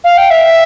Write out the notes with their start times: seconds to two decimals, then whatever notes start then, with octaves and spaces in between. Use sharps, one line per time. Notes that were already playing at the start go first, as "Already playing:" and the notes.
0.04 F5
0.17 G5
0.30 E5